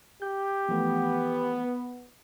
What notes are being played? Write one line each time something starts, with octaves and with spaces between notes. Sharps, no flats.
G4 G6
E3 F3 A3 B3